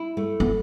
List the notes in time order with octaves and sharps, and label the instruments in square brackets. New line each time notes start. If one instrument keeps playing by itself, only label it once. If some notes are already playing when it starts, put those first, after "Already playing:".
Already playing: [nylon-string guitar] E4
A3
[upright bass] B3